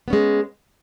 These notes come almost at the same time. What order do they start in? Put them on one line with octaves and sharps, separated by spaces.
B3 C#4 G#3